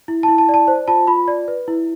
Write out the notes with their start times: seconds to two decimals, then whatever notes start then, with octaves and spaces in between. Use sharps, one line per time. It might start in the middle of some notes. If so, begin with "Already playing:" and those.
0.08 E4
0.23 E4 A5
0.38 A5
0.49 D5
0.54 A5
0.68 C5
0.88 F4 A5
1.07 F4 B5
1.28 D5
1.48 B4
1.68 E4